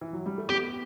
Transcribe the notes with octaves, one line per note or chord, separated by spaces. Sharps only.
E3
F#3
G3
A3
B3 G4